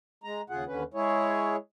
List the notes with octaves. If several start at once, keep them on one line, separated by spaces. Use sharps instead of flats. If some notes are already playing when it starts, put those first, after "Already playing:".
G#3 A#5
D#2 C#3 F4 G#4 F#5
D#2 D3 C#4 B4
G#3 E4 G#4 C#5